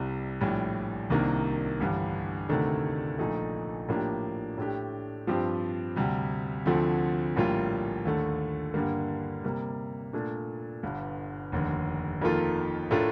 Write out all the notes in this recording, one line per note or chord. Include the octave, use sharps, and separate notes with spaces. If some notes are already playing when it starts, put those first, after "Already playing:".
Already playing: C2 C3 G3
A#1 A2 G3
C2 C3 D#3 A#3 D4
A1 G2 D3 G3
D2 C3 D#3 A3 D4
A#1 A#2 A3 D#4
A2 F3 A#3 D4 G4
A2 A3 D4 G4
G2 F3 C4 G4 C5
D2 C3 G3
D2 D3 F3 A3 C4
A#1 A2 G3 A#3 F4
D#2 D3 A3
G2 D3 G3 A#3
C3 G3 A#3
A#2 A3 D4
G1 G2 D3
F1 D#2 D3
F2 D#3 A#3 F4 A4
A2 A3 D4 F4 A#4